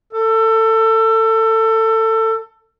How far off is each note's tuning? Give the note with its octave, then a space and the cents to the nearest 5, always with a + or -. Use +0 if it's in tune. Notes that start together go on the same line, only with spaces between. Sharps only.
A4 +25